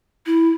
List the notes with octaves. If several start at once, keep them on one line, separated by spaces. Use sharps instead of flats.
E4